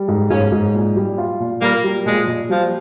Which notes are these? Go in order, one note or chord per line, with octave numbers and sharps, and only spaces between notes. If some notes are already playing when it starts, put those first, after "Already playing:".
Already playing: G3
G#2
G#2 A#3 C#4
G#2
A#2
G3
F4
A#2
A#2 G3 A#3
G3
A#2 F3 G#3
A#2
F3 G3